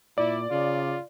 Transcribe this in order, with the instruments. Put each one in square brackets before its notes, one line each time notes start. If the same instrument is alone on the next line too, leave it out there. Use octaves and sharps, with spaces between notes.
[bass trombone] A#2 [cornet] E4 [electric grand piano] D5
[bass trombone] C#3 [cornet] F4